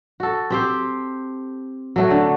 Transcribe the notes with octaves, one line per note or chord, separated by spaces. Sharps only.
F#4 A4
C4 G4 C5
F#3 A3 F#4
D3